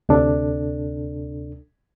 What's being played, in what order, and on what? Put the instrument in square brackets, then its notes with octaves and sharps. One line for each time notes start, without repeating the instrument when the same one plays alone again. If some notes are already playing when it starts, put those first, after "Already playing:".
[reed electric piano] D2 C3 D4 A4